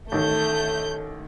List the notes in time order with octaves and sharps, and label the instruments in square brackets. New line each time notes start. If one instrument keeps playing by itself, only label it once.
[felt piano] A1 D#3 [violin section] A3 G6